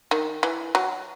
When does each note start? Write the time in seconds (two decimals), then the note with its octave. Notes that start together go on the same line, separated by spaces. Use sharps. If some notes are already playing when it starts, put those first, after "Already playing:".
0.11 D#3
0.43 E3
0.75 F#3